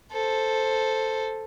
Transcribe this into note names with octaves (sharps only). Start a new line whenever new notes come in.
A4 C5